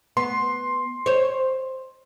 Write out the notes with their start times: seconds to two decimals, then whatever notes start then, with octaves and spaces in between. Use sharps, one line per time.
0.17 B3 C6
1.06 C5 C#5